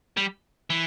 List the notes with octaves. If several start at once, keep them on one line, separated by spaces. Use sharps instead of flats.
G3
E3